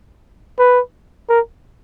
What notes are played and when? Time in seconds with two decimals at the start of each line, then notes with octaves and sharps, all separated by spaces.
0.59 B4
1.29 A#4